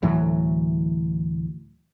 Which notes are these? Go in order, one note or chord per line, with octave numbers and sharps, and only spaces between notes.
D2 A2 E3 F#3